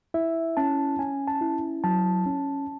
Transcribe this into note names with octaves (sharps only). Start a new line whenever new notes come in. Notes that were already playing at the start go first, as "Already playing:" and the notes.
E4 E5
C#4 A5
C#4 G#5
A5
E4
F#3 A5
C#4